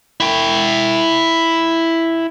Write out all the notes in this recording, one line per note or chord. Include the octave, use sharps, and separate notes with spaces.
E4 G5